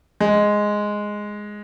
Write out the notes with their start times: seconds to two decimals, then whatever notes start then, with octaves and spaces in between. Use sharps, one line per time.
0.21 G#3